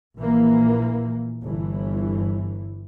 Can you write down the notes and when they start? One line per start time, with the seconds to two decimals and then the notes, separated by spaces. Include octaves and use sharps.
0.17 A#1 A#2 E3 A#3
1.43 G1 E3